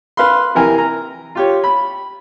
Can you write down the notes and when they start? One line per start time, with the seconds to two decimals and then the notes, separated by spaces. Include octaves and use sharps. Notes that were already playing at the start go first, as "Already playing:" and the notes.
0.17 B4 F5 B5 C6
0.55 C3 E3 A#4 G#5
0.78 A#5
1.35 F4 G4 C#5
1.64 B5